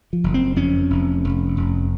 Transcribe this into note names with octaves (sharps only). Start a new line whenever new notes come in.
F3
F#1
C4
F2 C#4
F1
F1
F1